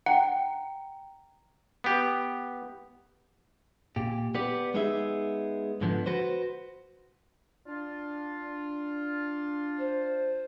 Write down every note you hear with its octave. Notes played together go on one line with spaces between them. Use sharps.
F#5 G5 A#5
B3 G4
A#2 G4
B3 G4 D5
G#3 B3 D#4 G#4 E5
G#2 D3 F3 B3
F#4 B4 C5
D4 F4
C5